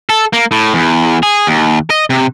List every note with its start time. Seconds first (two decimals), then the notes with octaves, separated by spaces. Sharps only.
0.10 A4
0.33 A#3
0.51 A2
0.74 E2
1.23 G#4
1.47 D#2
1.90 D#5
2.10 C3